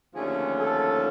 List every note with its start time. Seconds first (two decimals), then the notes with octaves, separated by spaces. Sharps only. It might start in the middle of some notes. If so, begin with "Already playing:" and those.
0.14 D#2 D3 F3 A3 C#4 G#4
0.57 A4